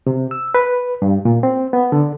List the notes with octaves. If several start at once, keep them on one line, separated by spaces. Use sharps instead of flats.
C3
E6
B4
G2
A#2
C4
B3
D3